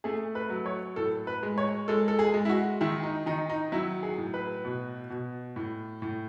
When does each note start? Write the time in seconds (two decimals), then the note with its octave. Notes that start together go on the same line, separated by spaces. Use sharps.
0.04 A3 G#4
0.35 B4
0.50 F#3
0.66 C#5
0.96 A2 A4
1.27 B4
1.43 G#3
1.58 C#5
1.88 G#3 A4
2.08 A4
2.19 G#4
2.34 G#3
2.45 E4
2.50 F#4
2.81 D#3 E4
3.03 D#4
3.26 D#3 D#4
3.50 D#4
3.72 F#3 E4
4.03 G#4
4.18 A2
4.34 B4
4.65 B2
5.10 B2
5.56 A2
6.02 A2